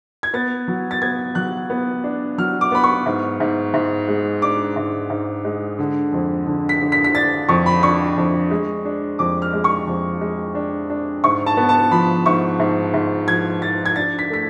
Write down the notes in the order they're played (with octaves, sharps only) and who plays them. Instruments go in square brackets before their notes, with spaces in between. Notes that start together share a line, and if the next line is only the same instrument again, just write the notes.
[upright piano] G#6
B3 A6
F#3
A6
B3 G#6
F#3 F#6
B3
D4
F#3 F6
D6
B3 B5
C#6
G#2
G#2
G#2
G#3
D4 D6
G#2
G#2
G#3
D3
F2
D3
B6
D3
B6
B6
D4 A6
F2 C#6
B5
D4 C#6
F2
G#3
D4
F2 D6
F6
G#3
C#6
F2
G#3
D4
D4
G#2 C#6
A5
B3
A5
F3 B5
G#2 C#6
G#2
G#2
F3 G#6
F3 A6
G#6
D4 A6
B6
A3 B6